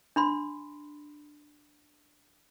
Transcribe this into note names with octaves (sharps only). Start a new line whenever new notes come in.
D4 B5 C6